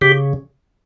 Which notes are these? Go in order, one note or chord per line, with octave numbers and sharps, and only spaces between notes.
C#3 G4